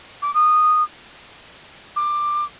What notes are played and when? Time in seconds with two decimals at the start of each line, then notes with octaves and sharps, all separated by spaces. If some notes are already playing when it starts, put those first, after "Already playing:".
0.22 D6
0.34 D#6
1.96 D6